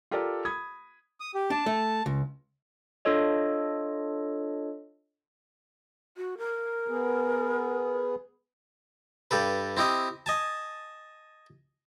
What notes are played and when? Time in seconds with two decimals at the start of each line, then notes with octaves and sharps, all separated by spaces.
0.11 F4 G4 A4 A#4 D5
0.45 B5 D#6 G#6
1.20 D#6
1.34 G4
1.50 D4 A5
1.66 A3
2.06 C#2
3.05 D4 F4 A4 C#5 D#5
6.17 F#4
6.38 A#4
6.88 B3 G#4
9.31 G2 G4 A4 B4
9.77 C4 E4 G4 D#5
10.26 D#5 G#5 A5